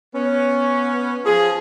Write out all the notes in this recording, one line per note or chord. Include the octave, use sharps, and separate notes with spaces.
B3 C#4
F3 G#4